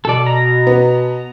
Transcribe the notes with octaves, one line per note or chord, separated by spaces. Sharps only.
B2 A4 D5
A#5
B3